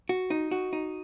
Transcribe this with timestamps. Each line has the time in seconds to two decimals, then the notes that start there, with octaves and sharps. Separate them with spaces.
0.09 F#4
0.30 D#4
0.51 F#4
0.73 D#4